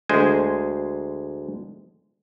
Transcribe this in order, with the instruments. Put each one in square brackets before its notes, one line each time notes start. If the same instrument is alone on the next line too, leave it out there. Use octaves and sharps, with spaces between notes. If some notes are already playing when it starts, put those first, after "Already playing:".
[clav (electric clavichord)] D2 G#3 C5 G#5